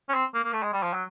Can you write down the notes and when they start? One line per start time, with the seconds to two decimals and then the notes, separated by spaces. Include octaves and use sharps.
0.09 C#4
0.14 C4
0.34 A#3
0.44 A#3
0.53 A3
0.63 G#3
0.73 G3
0.83 F3
0.93 F#3